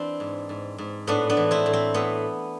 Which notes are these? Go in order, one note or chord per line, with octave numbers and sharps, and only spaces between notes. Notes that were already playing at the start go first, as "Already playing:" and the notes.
Already playing: E3 C4 D4 E4
G#2
G#2
G#2
A2 B3 D4
B3 D4
E3
C4 E4
A2
C4
A2 B3